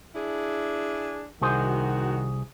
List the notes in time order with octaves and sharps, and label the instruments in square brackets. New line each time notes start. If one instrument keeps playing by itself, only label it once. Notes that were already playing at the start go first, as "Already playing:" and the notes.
[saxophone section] D4 E4 G#4
[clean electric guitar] C2 G#4 C5 [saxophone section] D#3 F#4